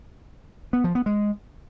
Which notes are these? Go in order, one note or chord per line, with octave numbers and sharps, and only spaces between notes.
B3
F3
B3
G#3